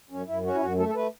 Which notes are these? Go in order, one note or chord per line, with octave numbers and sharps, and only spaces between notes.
F#2 C#4
F#2 E4
C#4 F#4
E4
F#2 F#4
A3 A4
A4
A3 B4